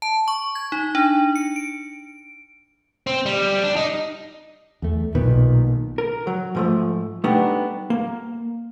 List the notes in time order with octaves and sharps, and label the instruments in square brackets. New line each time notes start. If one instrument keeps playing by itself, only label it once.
[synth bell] A5
C#6
G#6
D#4
D4
C#7
D7
[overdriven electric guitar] C4
G3
D4
D#4
[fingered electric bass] E2 A3
[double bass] B1 [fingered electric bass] A#2 D#3 B3
[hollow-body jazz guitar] A#4
F#3
G#2 F3 A3
G3 A3 B3 D4 D#4 G4
A#3